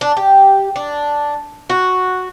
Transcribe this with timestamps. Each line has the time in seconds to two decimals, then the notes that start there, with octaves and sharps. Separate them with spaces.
0.01 D4
0.17 G4
0.76 D4
1.70 F#4